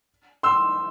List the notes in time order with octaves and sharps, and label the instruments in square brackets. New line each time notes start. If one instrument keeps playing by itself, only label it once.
[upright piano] C6 E6